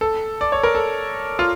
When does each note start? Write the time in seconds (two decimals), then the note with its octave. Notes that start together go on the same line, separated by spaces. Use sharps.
0.01 A4
0.41 D5
0.52 C#5
0.63 A#4
0.75 A4
1.39 F4